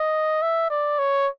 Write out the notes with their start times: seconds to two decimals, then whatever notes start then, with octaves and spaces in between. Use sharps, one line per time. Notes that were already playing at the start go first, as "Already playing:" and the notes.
Already playing: D#5
0.42 E5
0.70 D5
0.99 C#5